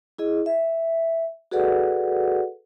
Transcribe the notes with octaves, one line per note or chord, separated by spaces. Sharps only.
E4 G#4 D#5
E5
F#4 G#4 A4 B4 D5 F#5